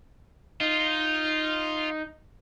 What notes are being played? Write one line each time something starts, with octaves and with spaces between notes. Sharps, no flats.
D#4 F4